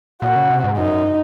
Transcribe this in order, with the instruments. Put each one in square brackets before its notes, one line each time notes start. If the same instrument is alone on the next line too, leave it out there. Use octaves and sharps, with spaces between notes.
[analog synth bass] A#2 [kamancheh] F#4
[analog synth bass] C#3
C3
G#2
[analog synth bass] F#2 [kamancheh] D#4